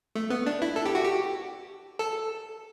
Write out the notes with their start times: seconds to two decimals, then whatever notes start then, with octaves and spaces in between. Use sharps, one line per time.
0.15 A3
0.30 B3
0.46 D4
0.62 E4
0.76 A4
0.86 G4
0.95 F#4
1.04 G4
1.99 A4